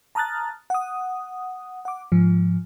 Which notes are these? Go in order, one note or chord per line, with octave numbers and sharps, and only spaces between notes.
A5 A#5 D#6 F6 F#6 A6
F#5 D#6
F#5 D6
G#2 F3